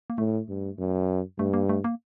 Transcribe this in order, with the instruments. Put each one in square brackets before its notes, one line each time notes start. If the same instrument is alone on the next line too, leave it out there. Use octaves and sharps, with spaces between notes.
[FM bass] A#3
[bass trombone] A2 [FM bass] A3
[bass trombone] G2
F#2
[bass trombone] G2 [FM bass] A3
[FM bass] A#3
A3
A#3